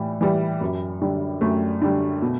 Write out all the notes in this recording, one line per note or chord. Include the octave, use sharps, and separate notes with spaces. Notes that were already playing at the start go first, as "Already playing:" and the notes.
Already playing: A2 E3 G3
E3 G3
F#2
D3 G3
F#2 A3
D3 G3
B2